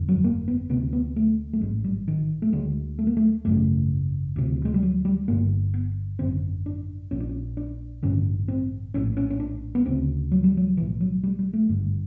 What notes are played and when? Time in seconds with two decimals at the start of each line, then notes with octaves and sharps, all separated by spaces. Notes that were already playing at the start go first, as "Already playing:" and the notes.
Already playing: G1 F2 D3
0.09 F#3
0.24 A#3
0.48 B3
0.70 D2 C3 B3
0.93 B3
1.16 A3
1.53 A3
1.61 A1 G#2 G#3
1.84 G3
2.08 D#3
2.42 A3
2.53 D2 D3 G#3
2.99 A3
3.07 A#3
3.17 A3
3.45 G#1 F#2 C#3 A3
4.36 D2 C3
4.65 G#3
4.74 G3
4.83 F#3
5.05 G3
5.28 G1 G2 D3 A#3
5.74 B3
6.19 G#1 F#2 D3 C4
6.66 D4
7.11 A#1 A#2 C#4
7.20 D4
7.29 C#4
7.57 D4
8.03 A1 G2 D3 C#4
8.48 C4
8.94 A#1 A2 C#4
9.17 C#4
9.30 C#4
9.40 D4
9.75 B3
9.85 D2 C#3 C4
10.32 F#3
10.44 G3
10.57 F#3
10.77 B1 A2 E3
11.01 F#3
11.23 G3
11.39 G3
11.53 A3
11.69 G#1 G2 D3